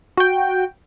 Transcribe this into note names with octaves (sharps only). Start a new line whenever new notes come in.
F#4 G5